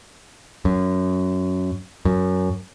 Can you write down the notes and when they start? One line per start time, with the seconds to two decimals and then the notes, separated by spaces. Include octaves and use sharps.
0.65 F#2
2.05 F#2